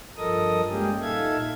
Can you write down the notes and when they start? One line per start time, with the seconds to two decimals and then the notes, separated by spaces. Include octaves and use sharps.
0.18 G2 F3 A4 A#4 D#5 D#6
0.69 G3 G#3 A#3 C#4 G4 G#4
1.01 A#2 D#4 A4 E5 F5 G#6